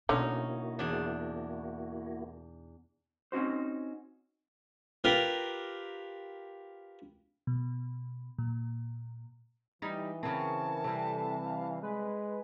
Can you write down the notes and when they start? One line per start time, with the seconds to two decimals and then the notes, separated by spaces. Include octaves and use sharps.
0.09 B2 D3 A#3 C#4 D#4 E4 F#4
0.79 E2 D4
3.32 C4 C#4 D#4 F#4 C5
5.04 F4 G4 A#4 B4
7.47 B2
8.38 A#2
9.82 E3 G3 D#4
10.23 C#3 C4 A#4 A5
10.84 C3 G3 A4
11.45 F5
11.83 G#3 B4